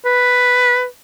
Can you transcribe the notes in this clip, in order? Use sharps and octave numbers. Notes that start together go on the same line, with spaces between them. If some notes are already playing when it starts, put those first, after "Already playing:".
B4